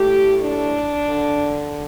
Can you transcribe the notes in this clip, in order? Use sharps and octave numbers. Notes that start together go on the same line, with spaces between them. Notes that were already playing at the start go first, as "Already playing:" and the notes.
Already playing: A2 A3 G4
D4
D3